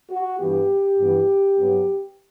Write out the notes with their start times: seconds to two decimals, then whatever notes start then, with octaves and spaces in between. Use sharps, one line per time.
0.09 F#4
0.38 G2 E3 B3 G4
0.97 G2 E3 B3
1.56 G2 F#3 B3